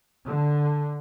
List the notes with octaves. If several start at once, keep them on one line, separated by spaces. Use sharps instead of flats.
D3